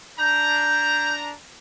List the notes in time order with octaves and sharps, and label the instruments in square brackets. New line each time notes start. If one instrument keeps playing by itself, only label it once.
[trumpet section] D4 A#5 [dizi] G6